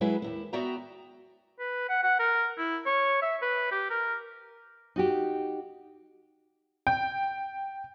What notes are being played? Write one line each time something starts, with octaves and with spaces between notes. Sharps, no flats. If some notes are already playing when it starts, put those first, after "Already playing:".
F#3 G#3 E4 G#4 B4
D#2 A#2 E4
B3 F#4 D5 E5 G5 A#5
B4
F#5
F#5
A#4
E4
C#5
E5
B4
G4
A#4
D#4 F#4 G4
G5